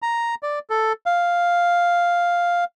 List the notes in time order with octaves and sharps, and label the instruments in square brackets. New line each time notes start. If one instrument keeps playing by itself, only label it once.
[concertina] A#5
D5
A4
F5